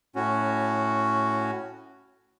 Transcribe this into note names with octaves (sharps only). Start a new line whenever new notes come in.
A2 C#4 F#4